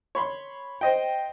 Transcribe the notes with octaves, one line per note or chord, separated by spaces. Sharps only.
C#5 B5 C6
C5 D#5 G5